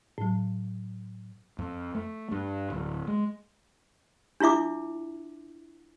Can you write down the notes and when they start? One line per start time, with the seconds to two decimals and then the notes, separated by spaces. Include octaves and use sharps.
0.18 A2 F#3
1.59 F2
1.95 A3
2.32 G2
2.70 D1
3.08 G#3
4.40 D4 E4 F4 E5 D6